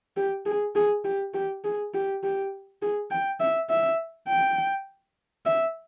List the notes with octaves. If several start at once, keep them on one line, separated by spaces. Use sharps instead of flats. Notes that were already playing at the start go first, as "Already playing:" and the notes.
G4
G#4
G#4
G4
G4
G#4
G4
G4
G#4
G5
E5
E5
G5
E5